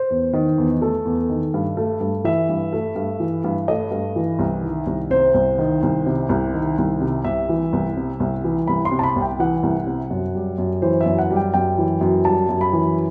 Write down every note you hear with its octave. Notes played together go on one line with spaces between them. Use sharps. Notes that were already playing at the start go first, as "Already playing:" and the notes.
Already playing: C5
E2
D#3
E2
A3 A4
E2
D#3
G2
A3
G2
E3 E5
G2
A3
G2
E3
G2
A3 D#5
G2
E3
C2
D#3
C2
C3 C5
C2
D#3
C2
C3
C2
D#3
C2
C3
C2 E5
E3
C2
C3
C2
E3
C2 B5
C6
C3
A5
B5
C2
G5
E3 F#5
C2
C3
F#2
G3
F#2
E3 C5
E5
F#2
F#5
G3
G5
F#2 G5
E3
F#2
G3 A5
F#2
B5
E3